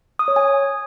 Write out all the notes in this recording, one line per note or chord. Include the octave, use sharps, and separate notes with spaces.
D#6
C#5
G#5